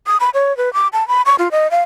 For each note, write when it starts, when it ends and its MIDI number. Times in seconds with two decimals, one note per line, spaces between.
0.07 0.17 87
0.20 0.30 83
0.34 0.56 73
0.57 0.73 71
0.74 0.88 86
0.93 1.06 81
1.08 1.22 83
1.26 1.35 85
1.39 1.49 65
1.51 1.70 75
1.71 1.82 77